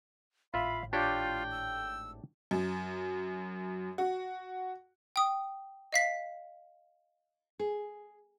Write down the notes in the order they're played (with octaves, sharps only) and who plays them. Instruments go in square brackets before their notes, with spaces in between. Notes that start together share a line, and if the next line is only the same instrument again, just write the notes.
[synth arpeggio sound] G#1 A2 [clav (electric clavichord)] F4 E5 [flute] F5 [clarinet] B5
[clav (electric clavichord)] D4 G4 C#5 [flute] F4 [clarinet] G5
[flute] E6
[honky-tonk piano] F#2
F#4
[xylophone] G5 D#6
D#5 F5 B6
[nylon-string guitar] G#4